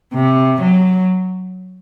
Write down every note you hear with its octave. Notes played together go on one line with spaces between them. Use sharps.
C3
F#3